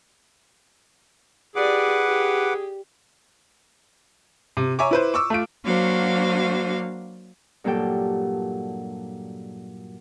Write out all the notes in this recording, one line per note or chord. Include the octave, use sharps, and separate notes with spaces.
G4 G#4 B4 D5 F#5 D6
G4
C3
C#5 E5 G#5 A#5 C#6 D6
E4 B4 C5
C#6 D6 E6
A3 F4 D7
F#3 A#3 D4 F#4 C5 F5
G2 A#2 F#3 G4 A4 G5